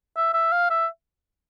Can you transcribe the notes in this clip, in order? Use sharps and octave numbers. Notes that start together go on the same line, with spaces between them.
E5
E5
F5
E5